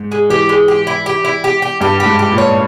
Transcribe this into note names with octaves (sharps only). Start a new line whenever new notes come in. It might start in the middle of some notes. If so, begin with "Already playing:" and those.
Already playing: G#2
G#3
E3 G4
G#3
G4
E4
G4
E4
G4
G4
G2 G4
G4
G#2
G4
A#2
C#5